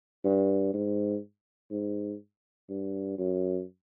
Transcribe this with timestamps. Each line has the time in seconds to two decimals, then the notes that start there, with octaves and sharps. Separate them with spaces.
0.25 G2
0.73 G#2
1.71 G#2
2.69 G2
3.18 F#2